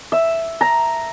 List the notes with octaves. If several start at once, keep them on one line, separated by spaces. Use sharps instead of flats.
E5
A#5